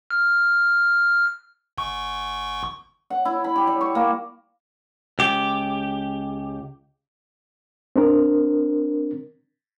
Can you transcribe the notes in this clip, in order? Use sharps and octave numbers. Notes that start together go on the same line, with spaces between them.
F6
G1 C#6
F#5
E4
B5
G4
G3
C#6
A#3
C#2 G4
C4 D4 A#4